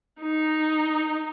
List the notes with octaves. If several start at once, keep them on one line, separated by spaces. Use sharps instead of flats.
D#4